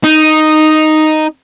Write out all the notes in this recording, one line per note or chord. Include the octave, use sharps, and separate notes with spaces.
D#4